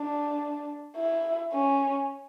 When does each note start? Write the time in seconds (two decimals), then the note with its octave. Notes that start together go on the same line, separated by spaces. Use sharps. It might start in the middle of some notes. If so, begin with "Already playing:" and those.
Already playing: D4
0.97 E4
1.53 C#4